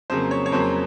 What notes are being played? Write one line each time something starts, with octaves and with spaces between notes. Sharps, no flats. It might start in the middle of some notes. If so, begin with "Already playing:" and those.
F2 C#3 F#3 A#3 C5
C#5
C#5
F2 C#3 F#3 A#3 C5